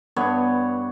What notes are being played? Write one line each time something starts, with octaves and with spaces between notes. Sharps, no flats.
G2 B3 C#5